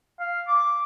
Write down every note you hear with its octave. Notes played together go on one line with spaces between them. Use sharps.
F5
D6